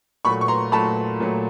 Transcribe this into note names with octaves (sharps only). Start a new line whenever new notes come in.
A#2 F#3 A3 B5 C#6
C#6
A#5 C6
A#2 F#3 A3 A5 B5
A#2 F#3 A3